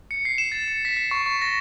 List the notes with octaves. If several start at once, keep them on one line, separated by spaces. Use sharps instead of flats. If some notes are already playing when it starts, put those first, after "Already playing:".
C#7
C7
E7
A6
C#7
B6
B6
C#6
C#6
A#6